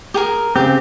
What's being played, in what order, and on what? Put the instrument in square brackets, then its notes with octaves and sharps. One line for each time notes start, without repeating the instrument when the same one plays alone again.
[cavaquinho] G4 G#4 A#4
[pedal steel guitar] C#3 C4 [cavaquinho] G4